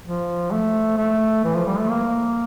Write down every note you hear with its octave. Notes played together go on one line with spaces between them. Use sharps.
F3
A3
A3
E3
F3
G3
A3
A#3